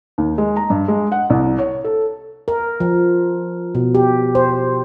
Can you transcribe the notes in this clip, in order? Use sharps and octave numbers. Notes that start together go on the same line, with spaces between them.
D#2
G#3
A#5
G2
G#3
F#5
C2
C#5
A4
A#4
F3
B2
G4
C5